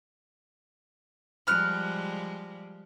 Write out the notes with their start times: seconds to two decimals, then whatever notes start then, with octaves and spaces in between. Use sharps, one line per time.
1.47 F3 G3 G#3 B5 F6 F#6